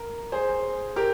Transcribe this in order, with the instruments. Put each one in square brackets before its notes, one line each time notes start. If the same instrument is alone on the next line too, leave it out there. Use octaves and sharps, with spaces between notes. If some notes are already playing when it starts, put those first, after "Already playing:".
Already playing: [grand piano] A#4
G#4 C5
G4 A#4